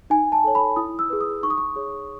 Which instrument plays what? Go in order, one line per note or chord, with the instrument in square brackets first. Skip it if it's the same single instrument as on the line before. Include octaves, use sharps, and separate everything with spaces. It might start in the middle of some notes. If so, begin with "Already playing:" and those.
[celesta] D#4 G#5
A5
A4 C#5
B5
E4 D#6
E6
G#4 B4
D#6
D#4 C#6
D#6
C#6
G#4 C#5